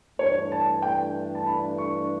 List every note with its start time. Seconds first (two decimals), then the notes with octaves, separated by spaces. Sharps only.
0.19 G2 E3 A3 D4 C#5
0.52 A5
0.82 G5
1.35 A5
1.46 B5
1.78 C#6